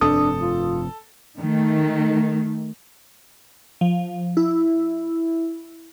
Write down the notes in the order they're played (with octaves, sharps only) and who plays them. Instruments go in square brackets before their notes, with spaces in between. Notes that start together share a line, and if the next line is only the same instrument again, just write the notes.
[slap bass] F1 G2 C4 [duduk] D4 [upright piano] A4 [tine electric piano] D#6
[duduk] F4
[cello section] D#3 A3
[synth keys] F3
E4